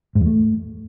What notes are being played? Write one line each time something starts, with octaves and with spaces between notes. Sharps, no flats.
G#2
E2
A3